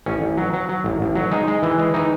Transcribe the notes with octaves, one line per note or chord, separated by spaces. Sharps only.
A1 C#4
A1
F#3
F#3
F#3
A1
A1
F#3
G#3 D#4
G#3
E3
G#3
E3 D#4